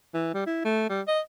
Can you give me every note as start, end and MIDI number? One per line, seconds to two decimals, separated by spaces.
0.14 0.30 52
0.34 0.43 55
0.47 0.64 64
0.65 0.85 57
0.89 1.01 55
1.08 1.20 75